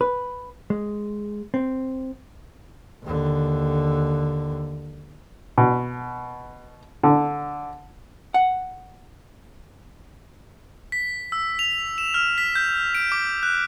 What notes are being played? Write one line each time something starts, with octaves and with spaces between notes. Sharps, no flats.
B4
G#3
C4
D#2 D3
B2
D3
F#5
B6
E6
F7
E7
F6
B6
G6
D7
D6
F#6